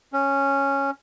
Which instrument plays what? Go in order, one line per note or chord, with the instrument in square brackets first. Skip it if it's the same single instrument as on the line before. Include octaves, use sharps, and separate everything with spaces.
[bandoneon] C#4